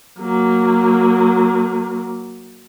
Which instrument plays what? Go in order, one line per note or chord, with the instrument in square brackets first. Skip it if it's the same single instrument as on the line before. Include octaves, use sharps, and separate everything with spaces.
[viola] F#3 A#3